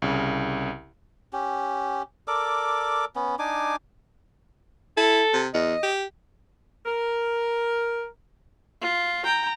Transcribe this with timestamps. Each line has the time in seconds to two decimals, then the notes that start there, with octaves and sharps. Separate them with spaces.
0.02 C2 C#3
1.33 C#4 G4
2.28 A4 A#4 D5 D6
3.16 B3 C#4
3.39 D4 D#4 G#5 D6
4.97 E4 A4
5.33 C3
5.54 E2 D#5
5.83 G4
6.86 A#4
8.82 F4
9.25 G5 A#5